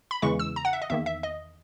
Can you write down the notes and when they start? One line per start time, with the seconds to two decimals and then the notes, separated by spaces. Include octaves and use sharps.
0.11 B5
0.22 E2 C#3 E3 G#3 C#6
0.39 E6
0.56 A#5
0.65 F#5
0.73 E5
0.82 D#5
0.90 E2 D#3 A#3 E5
1.06 E5
1.23 D#5